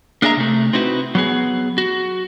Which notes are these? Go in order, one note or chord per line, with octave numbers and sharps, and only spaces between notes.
A#3 D4 G#4 D#5 E5 A#5
C3 A3
C4 D#4 E4 F#4 B4
F#3 B3 G#4
F#4